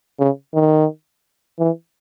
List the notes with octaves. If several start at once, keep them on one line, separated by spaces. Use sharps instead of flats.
C#3
D#3
E3